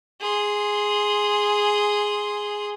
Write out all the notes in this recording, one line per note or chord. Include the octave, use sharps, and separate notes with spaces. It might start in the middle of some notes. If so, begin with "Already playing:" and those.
G#4 C6